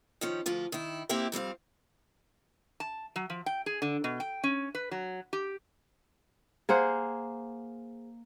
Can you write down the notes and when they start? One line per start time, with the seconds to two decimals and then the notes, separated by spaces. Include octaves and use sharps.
0.21 D#3 F3 C#4
0.46 D2 F3 F4
0.72 D#3 E4
1.09 A#3 C4 E4 G4 E5
1.32 F2 G3 C4 F5
2.80 A5
3.16 F#3
3.30 F3
3.46 G5
3.66 G#4
3.82 D3
4.04 B2
4.20 G5
4.44 C#4
4.75 B4
4.91 F#3
5.33 G4
6.69 A#3 G#4 C5 F#5